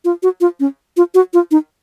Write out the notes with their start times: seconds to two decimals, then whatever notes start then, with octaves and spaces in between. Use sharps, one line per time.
0.05 F4
0.23 F#4
0.41 F4
0.60 C#4
0.97 F4
1.14 F#4
1.33 F4
1.51 D#4